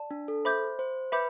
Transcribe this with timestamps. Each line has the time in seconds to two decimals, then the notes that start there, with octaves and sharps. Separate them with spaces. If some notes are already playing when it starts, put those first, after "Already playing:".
Already playing: D5 A5
0.11 D4
0.28 A4
0.45 C5 E5 B5 D6 G6
0.79 C5
1.12 B4 E5 B5 D6 G6